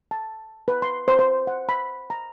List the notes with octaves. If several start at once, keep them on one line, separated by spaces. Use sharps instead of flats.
A5
B4
C6
C5
C5
F#5
B5
A#5